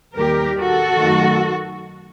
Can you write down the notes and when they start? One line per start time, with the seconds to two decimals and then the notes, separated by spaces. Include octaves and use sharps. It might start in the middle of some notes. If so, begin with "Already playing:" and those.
0.16 D#2 D#3 G3 G4 A#4
0.58 F#4 A4
1.00 F#2 D#3 A3